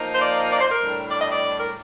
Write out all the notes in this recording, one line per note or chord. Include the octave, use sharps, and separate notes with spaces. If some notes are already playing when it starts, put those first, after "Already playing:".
Already playing: F3 A#3 D#4
C5
D5
D5
C5
A#4
A2 G3 D4
D5
D#5
D5
A#4